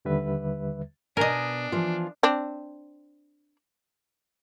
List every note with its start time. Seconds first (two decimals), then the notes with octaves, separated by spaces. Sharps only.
0.05 D#2 D3 G3 B4 E5
1.17 B2 D4 A#4 D#5 G#5
1.72 E3 F3 F4
2.23 C4 D4